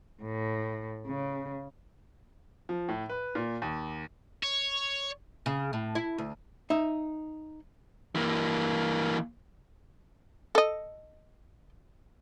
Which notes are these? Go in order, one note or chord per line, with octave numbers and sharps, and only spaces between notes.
A2
C#3
F3
A2
B4
A#2
D#2
C#5
C#3
A2
E4
D2
D#4 E5
E3 A#3
A4 D#5